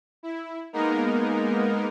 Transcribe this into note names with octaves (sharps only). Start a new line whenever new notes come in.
E4
G#3 A#3 B3 D#4 A#4